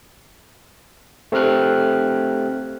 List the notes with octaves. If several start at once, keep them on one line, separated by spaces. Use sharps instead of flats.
A3 C4 G4 F6 F#6